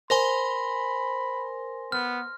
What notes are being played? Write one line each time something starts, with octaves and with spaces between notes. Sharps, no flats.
A#4 C5 G#5 B5 C6 A#6
B3 F6